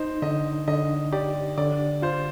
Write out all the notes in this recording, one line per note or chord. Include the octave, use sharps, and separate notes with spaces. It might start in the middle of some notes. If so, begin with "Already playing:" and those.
Already playing: D#4 C5
D3 D#5
D3 D#5
G4 D5
D3 D5
F4 C5